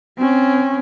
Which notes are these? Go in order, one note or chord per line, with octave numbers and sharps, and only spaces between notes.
C4 C#4